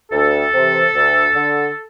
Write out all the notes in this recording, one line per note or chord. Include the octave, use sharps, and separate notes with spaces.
D2 A4
C3 E3
D2
D3